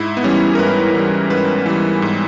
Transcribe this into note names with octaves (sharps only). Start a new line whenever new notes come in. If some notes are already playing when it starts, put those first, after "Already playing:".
Already playing: G#2 E4
B3
E3 G3 C#4
A#4
G#2 B4
E3 G3
G#2 B4
E3 G3
G#2